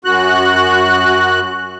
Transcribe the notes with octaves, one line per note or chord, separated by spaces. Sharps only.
F#2 F#4 F#6